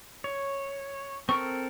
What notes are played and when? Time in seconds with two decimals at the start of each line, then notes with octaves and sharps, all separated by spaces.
0.24 C#5
1.29 C4 A4 A#4 C#6